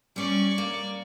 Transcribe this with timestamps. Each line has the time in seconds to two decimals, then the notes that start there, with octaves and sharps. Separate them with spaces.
0.16 G3 C#4 D5 C#6
0.58 A#3